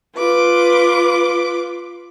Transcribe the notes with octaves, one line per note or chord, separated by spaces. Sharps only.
F4 B4 D6